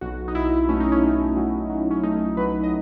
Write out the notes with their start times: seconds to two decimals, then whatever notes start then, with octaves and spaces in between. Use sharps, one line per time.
0.01 B1 F#4
0.28 D#4
0.35 B1 E4
0.69 A3 C#4
0.80 D#4
0.92 C#4
1.03 A3
1.36 F#3
1.70 F#3
1.91 C#4
2.03 A3 D#4
2.37 F#3 B4
2.64 D#5